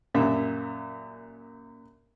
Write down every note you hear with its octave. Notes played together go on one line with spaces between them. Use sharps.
F#2 A#2 G3 E5